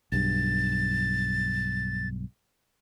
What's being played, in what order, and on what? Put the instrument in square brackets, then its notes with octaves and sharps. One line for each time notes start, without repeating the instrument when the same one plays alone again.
[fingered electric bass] B1 G2 [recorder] A6